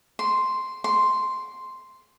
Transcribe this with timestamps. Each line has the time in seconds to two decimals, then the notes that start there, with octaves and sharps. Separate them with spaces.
0.19 C6
0.84 C6